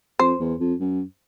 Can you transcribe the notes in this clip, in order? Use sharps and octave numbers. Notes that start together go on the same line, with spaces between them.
F2 C5
E2
F2
F#2